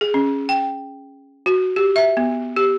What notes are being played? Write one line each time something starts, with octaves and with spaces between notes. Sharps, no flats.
G#4
C#4
G5
F#4
G4
E5
B3
G4